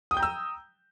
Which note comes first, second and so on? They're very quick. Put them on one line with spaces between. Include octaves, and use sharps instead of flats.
D#6 G5 G6 A#5 E6